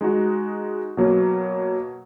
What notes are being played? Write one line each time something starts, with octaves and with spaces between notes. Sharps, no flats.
G#3 D#4 F#4
B2 F#3 A#3